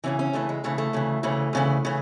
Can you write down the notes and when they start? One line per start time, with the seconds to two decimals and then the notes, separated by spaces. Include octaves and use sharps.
0.04 D2 C#3 E3 C#4
0.19 C#4
0.33 D2 C#3 E3 A3
0.49 G#3
0.64 D2 C#3 E3 A3
0.78 A3
0.93 D2 C#3 E3
1.23 D2 C#3 E3 A3
1.53 D2 C#3 E3
1.85 C#3 E3